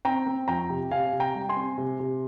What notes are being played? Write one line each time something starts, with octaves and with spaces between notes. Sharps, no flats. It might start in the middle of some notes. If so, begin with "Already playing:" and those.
C4 G5 A#5
C4
F2 G5 A#5
C3
C3 F5 G#5
C3
G5 A#5
G3
G#5 C6
C4
C3
C3